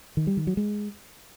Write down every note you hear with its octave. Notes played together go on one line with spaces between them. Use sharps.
D#3
G3
D#3
F#3
G#3